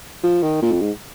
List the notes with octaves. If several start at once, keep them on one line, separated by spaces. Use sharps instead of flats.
F3
D#3
A#2
F2
G#2